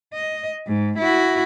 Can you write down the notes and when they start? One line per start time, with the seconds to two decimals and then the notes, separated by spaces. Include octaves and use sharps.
0.14 D#5
0.67 G#2
0.98 E4 F#4